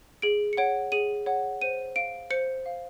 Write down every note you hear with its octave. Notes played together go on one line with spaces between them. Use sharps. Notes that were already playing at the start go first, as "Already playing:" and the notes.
G#4 D7
C#7
C#5 F#5 D7
G#4 D#7
C#5 F#5
C5 D#7
F5 D7
C5 C#7
F5